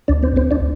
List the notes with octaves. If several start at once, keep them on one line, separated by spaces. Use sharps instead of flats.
D2 D4 D5
C4 C5
D2 C4 C5
D4 D5